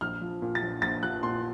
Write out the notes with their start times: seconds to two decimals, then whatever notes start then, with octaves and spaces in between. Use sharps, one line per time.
0.01 A#1 F6
0.21 F3
0.42 A#2
0.55 A6
0.62 A#1
0.82 A#1 A6
1.03 F3 F#6
1.23 A#2 C6